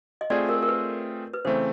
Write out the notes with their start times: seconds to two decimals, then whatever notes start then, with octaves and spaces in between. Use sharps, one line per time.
0.21 D#5
0.30 A3 C4 F4 G#4 D5
0.49 A#4
0.62 A#4
0.68 B4
1.33 B4
1.45 C#3 E3 A3 C4 C5